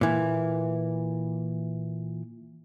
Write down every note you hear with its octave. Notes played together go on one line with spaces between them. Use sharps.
A#2 E3